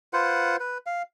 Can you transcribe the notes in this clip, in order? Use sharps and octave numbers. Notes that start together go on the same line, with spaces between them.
F4 B4 C5 F#5
B4
F5